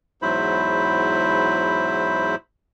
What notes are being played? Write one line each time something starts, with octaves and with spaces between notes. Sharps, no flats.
E2 G#2 F#3 E4 C5 B5